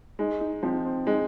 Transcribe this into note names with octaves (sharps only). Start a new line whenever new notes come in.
G#3 D#4
D#4
F3 C4
C4
G#3 D#4